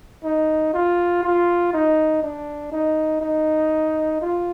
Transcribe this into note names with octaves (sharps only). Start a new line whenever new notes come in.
D#4
F4
F4
D#4
D4
D#4
D#4
F4